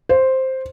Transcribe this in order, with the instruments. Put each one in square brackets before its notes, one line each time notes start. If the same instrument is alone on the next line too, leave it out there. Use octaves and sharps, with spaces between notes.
[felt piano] C5